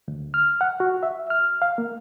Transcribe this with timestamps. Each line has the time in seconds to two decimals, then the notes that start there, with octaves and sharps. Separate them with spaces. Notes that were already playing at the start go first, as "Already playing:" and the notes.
0.08 D2
0.34 F6
0.61 F#5
0.80 F#4
1.03 E5
1.30 F6
1.62 F5
1.78 A#3